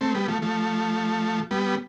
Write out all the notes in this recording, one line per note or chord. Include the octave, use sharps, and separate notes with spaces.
A3 C4
G3 B3
F3 A3
F3 A3
G3 B3